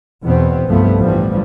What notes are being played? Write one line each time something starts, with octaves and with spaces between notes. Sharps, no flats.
E2 B2 B3 C4
C2 G2 F3 A3 B3
G1 A2 E3 F3 G3